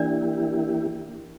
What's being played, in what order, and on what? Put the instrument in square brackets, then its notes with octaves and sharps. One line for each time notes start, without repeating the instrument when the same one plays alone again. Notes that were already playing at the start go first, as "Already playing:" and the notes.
Already playing: [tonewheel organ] E3 A#3 E4 G4 [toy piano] D4 D5